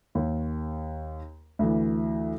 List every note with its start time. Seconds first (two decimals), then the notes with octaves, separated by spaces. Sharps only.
0.15 D#2
1.59 D2 E3